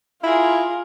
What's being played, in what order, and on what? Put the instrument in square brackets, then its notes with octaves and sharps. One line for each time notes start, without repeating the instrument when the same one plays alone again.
[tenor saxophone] E4 [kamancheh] F4 [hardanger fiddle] G#4 A#4